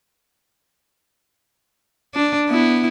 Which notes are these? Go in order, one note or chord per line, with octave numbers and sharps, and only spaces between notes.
D4
B3 E4